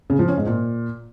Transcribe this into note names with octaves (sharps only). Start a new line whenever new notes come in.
C#3
F3
C#4
G#2
A#2